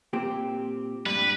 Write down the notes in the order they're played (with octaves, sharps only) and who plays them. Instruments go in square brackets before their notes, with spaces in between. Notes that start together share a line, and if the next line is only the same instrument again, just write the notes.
[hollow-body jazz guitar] A#2 C4 G4
[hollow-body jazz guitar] G2 [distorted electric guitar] B4